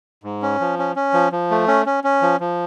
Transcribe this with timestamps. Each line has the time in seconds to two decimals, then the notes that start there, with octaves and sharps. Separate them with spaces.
0.24 G#2
0.42 C#4
0.60 F3
0.79 C#4
0.96 C#4
1.14 F3
1.32 F3
1.51 A3
1.68 C#4
1.86 C#4
2.04 C#4
2.22 F3
2.40 F3